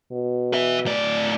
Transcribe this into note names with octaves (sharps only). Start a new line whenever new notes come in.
B2
B4 E5
A2 D5